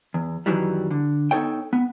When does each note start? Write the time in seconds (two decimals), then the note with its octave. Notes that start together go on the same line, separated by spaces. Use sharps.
0.14 E2
0.46 F#2 D#3 E3 F#3 G3
0.91 D3
1.31 B3 D#4 A4 C#5 G5
1.73 B3